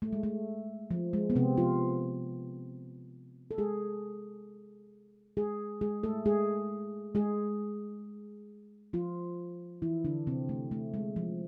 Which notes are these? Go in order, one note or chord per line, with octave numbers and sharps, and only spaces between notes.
A3
G#3
A3
F3
G#3
B3
C3 C4
F3 F4
A4
G#3 G#4
G#3 G#4
G#3 G#4
A3 A4
G#3 G#4
G#3 G#4
F3 F4
E3 E4
D3 D4
C3 C4
A3
A3
G#3
F3